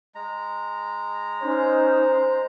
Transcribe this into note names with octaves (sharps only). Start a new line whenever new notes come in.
G#3 A#5
C#4 D#4 C5